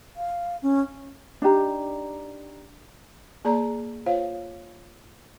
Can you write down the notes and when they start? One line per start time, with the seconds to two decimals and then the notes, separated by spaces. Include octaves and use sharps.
0.16 F5
0.62 C#4
1.42 D4 D#4 G4 A#5
3.45 A#3 G#4 D5 A#5
4.06 F4 C5 C#5 F5